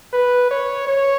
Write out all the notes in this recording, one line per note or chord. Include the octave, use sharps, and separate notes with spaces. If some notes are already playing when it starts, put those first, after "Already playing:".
B4
C#5
C#5